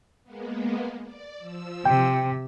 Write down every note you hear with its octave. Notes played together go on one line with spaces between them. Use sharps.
G#3 A#3 B3
D5
F3 E6
C3 G5